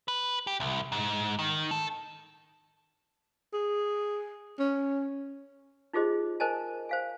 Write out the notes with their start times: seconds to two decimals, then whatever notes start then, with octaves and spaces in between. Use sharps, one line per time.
0.08 B4
0.47 G4
0.60 C2
0.92 G#2
1.39 D#3
1.71 A4
3.54 G#4
4.59 C#4
5.93 D#4 F4 G4 G#4 C5 D#5
6.40 A#4 C5 D#5 G#5 A5
6.89 C5 F5 G#5